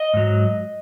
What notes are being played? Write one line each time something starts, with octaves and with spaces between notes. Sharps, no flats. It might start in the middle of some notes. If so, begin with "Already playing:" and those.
Already playing: D#5
G#2 F#3